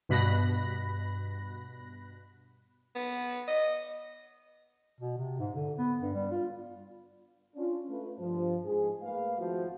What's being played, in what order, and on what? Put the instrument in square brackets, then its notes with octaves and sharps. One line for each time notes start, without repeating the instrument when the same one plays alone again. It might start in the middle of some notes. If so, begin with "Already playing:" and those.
[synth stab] G2 B2 B5 F#6 A#6
[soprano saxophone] B3
D#5
[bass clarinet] B2
C3
G#2
D3
B3
G2
G3
F4
[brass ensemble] C#4 D4 F4
A3 F4 B4
G2 F3
G#2 G#4
A3 A#3 B4 F5
G#1 F3 E4 F#4